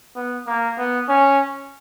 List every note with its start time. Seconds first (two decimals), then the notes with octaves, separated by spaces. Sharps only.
0.16 B3
0.47 A#3
0.78 B3
1.09 C#4